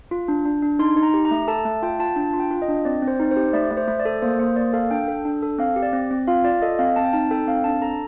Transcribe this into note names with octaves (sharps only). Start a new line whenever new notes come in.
F4
D4
D4
D4
D#4 C6
D#4
A#5
G4
A#5
A3
A4 A5
A3 A5
F4 G5
F4 A5
D4 A5
F4
G5
F4
D#5
D4
C4 D5
C4
C5
D#4
C5
G4
A3 D5
A3
C5
A3
D5
A4
A#3 C5
A#3 C5
A#3 D5
A4 F5
D4 G5
A4
D4
A4
C4 F5
G4
D5
C4
C4
F4 F5
F4 D5
A4 D#5
C4 F5
C4 A5
G5
D#4 A5
A4 G5
C4 F5
D4 A5
A4 A#5